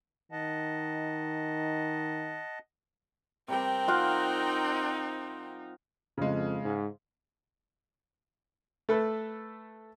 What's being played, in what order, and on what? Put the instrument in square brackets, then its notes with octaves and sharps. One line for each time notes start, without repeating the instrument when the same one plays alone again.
[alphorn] D#3 [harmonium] D#5 F#5 A5
[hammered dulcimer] C3 G3 G4 [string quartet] C4 A#4 G5
[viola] D#4 [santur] F4 F5 F#5
[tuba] F2 [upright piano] C#3 G#3
[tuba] G#2
[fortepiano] A3 A4 B4